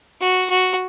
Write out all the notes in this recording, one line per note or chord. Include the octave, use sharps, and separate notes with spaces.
F#4
F#4